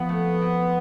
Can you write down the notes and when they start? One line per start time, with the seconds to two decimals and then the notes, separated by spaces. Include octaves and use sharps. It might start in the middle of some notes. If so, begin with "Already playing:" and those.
Already playing: F3 B3 C4
0.09 A3
0.41 C4